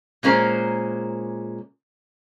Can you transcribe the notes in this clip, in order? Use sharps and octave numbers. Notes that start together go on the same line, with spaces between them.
A#2 G#3 C#4 A#4 C5